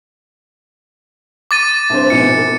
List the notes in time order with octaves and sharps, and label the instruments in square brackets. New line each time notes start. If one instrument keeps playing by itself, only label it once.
[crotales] D6 A6 D#7
[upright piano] C2 G2 C5
[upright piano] A#1 G#2 B2 [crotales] C#7
[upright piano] A#4